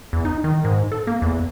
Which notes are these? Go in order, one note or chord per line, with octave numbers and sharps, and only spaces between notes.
E2
D#4
D#3
G#2
A4
A#3
E2